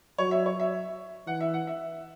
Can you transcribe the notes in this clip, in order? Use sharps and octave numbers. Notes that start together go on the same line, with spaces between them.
F#3 C#5
E5
C#5
E5
E3 F#5
E5
F#5
E5